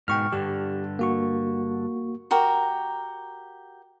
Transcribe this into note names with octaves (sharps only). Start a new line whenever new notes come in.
G#2 B2 G5 C#6 F6
G2 D3 G4
A#3 F#4 C#6
F#4 G4 A#4